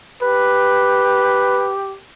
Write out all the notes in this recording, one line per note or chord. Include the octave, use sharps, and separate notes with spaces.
G4 B4